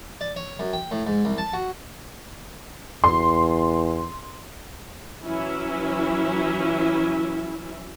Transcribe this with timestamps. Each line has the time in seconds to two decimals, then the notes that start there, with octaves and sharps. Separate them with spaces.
0.21 D5
0.36 C#5
0.59 F#2
0.73 G5
0.91 A2
1.06 G#2
1.25 C2
1.38 A5
1.53 F#4
3.04 E2 C6
5.23 E3 F#3 C#4 E4 E5